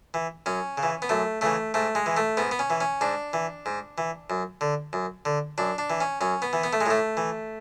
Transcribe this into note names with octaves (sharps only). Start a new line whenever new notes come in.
E3
F#2 C#4
C#3
E3
B3
F#2 A3
C#3 E3 A3
G#2 A3
G#3
E3
A3
G#2 B3
B3
C#4
E3
C#4
G#2 D4
E3
G#2
E3
F#2
D3
F#2
D3
F#2 D4
D4
E3
C#4
F#2 C#4
B3
E3
B3
A3
G#3
A2 A3
E3